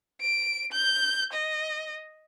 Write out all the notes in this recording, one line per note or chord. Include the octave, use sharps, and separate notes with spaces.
D7
G6
D#5